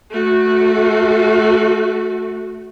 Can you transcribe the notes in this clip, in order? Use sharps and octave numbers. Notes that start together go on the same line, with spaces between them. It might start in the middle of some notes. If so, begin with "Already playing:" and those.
A3 F#4